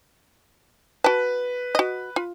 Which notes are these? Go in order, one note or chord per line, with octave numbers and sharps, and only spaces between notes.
F#4 B4 A5
F#4 D#5
F4